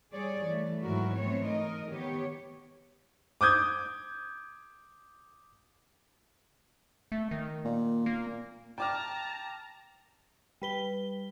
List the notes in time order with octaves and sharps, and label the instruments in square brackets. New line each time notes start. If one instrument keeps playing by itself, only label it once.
[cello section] G3 G#4 C#5 D5
E3 A3
G#2 D#3 F#3 E4 F#4 A#4
E3 A3 B3 C4 C#5
D#4 A#4 D#5
D#3 B3 G4 C#5
[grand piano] D6 D#6 G6 G#6
[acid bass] A3
D#3
[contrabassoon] A#2
[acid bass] A#3
[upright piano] G5 D6 F6 [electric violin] A5 A#5
[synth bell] G3 B4 G7